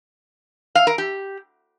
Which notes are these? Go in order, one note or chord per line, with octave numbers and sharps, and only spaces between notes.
F5
A#4
G4